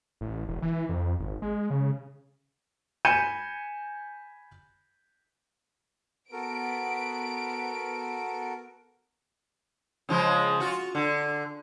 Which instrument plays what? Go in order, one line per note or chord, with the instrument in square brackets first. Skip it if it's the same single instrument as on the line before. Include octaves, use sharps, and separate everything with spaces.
[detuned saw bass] A1
E1
E3
F2
G#1
G#3
C#3
[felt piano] G#5 B5 G6 C#7 D#7 E7
[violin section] B3 D7 [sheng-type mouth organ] F#4 A4 A#4
[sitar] C#3 F3 G#3
F4 F#4
D3